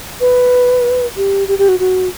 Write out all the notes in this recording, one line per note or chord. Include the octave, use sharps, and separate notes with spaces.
B4
G4
G4
G4
F#4
F#4